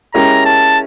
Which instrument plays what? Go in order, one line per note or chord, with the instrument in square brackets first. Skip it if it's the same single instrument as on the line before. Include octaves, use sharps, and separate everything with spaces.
[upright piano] G#3 C#4 E4 G4 A#4 [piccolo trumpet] A#5
[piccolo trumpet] A5